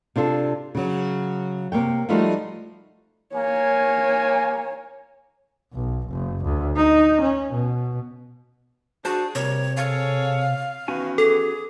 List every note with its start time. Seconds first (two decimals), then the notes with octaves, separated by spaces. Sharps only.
0.16 C3 D4 F4 A4
0.75 C#3 F#3
1.72 C3 A#3 C#5 G5
2.09 F3 G3 A3 D#4 F4 F#4
3.34 A#3 C#5 G#5
5.74 B1
6.09 F#1
6.44 D2
6.77 D#4
7.22 C#4
7.53 B2
9.05 D4 F#4 G#4 C5 A5
9.35 C3 G3 A#3 C#5
9.77 G#4 A4 C#5 F5
10.88 D#3 E3 B3 C#4 F#4 G#5
11.18 G#4 A4